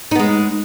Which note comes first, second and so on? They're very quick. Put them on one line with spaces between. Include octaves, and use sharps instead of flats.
D#4 B3 G#3